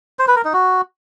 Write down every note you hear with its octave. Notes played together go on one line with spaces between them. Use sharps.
C5
B4
A#4
D#4
F#4